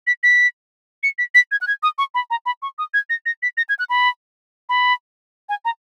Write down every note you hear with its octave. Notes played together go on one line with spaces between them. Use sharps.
B6
B6
C#7
B6
B6
G#6
F#6
G#6
D#6
C#6
B5
A#5
B5
C#6
D#6
G#6
A#6
A#6
B6
A#6
G#6
F#6
B5
B5
G#5
A#5